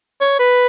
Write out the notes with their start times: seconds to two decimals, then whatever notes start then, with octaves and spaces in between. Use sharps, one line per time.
0.21 C#5
0.39 B4